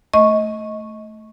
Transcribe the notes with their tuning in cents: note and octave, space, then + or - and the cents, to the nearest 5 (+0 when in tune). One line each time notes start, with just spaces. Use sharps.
A3 +0 D#5 +20 C#6 -10